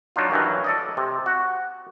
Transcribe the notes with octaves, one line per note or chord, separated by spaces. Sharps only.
F#3 D4 D#4 F4
G2 D#3 E3 F#3
A4 D5 D#5
C3
F#4